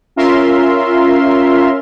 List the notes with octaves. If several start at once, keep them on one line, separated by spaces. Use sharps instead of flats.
C#4 F4 A#4 E5 F5 C6